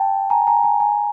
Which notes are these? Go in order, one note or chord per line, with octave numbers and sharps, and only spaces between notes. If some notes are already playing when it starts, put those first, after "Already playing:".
Already playing: G5 A5
G#5 A#5
G#5 A#5
G#5 A#5
G#5 A#5